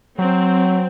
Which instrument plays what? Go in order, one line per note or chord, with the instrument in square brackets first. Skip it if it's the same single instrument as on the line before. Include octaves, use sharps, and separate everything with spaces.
[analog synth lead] F#3 [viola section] C4